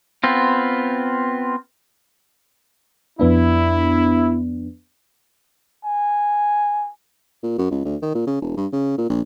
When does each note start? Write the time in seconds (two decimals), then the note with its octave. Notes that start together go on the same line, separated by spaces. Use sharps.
0.24 B3 C4 F4
3.20 F2 B3 D4 E4
5.85 G#5
7.43 A#2
7.58 F#2
7.71 C#2
7.85 D2
8.02 D#3
8.15 A#2
8.27 C#3
8.42 E1
8.57 G2
8.73 C#3
8.98 A#2
9.10 A#1